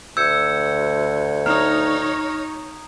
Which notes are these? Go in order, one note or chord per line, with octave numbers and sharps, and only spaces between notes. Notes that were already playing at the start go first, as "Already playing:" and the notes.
D2 E6 G6 G#6 C#7
D#4 C#5 A#5 D#6 F6